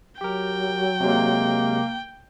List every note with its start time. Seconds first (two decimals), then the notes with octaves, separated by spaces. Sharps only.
0.21 F#3 G4 A#4 G5
1.00 C3 G#3 A#3